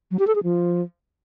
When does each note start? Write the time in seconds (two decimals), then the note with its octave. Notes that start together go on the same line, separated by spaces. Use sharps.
0.11 F#3
0.19 G4
0.27 A4
0.35 G#4
0.43 F3